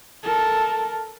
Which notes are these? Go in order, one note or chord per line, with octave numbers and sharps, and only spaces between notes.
A4 A#4